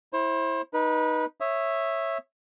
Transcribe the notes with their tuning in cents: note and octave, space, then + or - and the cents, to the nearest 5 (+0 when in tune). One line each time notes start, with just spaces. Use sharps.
E4 +0 C5 +35
D#4 +0 B4 -25
C#5 -15 E5 +0 D#6 +0